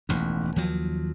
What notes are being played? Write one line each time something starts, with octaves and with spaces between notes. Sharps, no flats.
E1 A1 D#2
D#2 F3 F#3